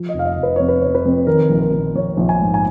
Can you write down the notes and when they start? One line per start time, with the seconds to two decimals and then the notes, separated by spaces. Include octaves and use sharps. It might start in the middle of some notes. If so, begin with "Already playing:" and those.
Already playing: F3
0.09 D#5
0.14 F1
0.19 F5
0.25 D#5
0.37 F1
0.43 B4
0.56 F2 C#5
0.69 B4
0.82 F1 C#5
0.95 B4
1.05 F2
1.27 D#3 A#4
1.49 A#1
1.61 A#4
1.72 A#1
1.95 A#1 C#5
2.17 A#1
2.29 G#5
2.41 G#2
2.54 G#5